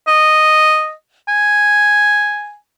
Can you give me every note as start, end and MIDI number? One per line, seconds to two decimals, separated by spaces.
0.07 0.92 75
1.28 2.56 80